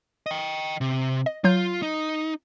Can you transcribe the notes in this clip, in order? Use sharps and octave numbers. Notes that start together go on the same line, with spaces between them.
D#5 G5
C3
D#5
F#3 F4 G6
D#4